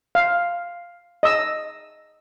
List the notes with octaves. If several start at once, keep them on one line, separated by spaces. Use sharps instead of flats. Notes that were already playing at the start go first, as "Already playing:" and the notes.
F5
D#5 E6